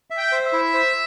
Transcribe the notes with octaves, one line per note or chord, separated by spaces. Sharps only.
E5
G5
C5
E5
E4
C5